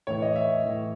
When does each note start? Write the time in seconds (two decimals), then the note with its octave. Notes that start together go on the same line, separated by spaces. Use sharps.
0.07 A2 E3 C#5
0.22 D#5
0.36 E5
0.65 A2 E3